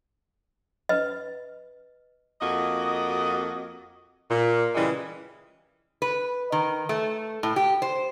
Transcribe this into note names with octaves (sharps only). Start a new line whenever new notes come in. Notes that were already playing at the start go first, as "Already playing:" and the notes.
B4 D#5
F2 A#3 F#4 D#5
A#2
C#3 E3 G3 G#3
B4
D#3
A3
A2
G4
C5